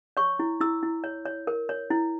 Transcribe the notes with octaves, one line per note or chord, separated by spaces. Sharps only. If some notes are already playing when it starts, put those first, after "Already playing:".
C#5 C#6
E4
E4 E6
E4
C#5
C#5
A#4
C#5
E4